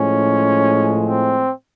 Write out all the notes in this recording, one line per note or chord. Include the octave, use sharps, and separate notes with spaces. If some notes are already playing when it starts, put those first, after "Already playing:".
Already playing: A2 F3 G#3 C#4
C4